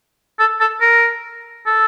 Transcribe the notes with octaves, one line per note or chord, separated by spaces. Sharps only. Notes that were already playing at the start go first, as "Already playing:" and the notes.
A4
A4
A#4
A4